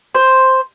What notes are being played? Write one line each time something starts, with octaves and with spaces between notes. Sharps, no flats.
C5